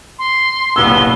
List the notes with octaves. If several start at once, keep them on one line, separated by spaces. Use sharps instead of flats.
C6
F#1 G2 B2 B3 E6 G7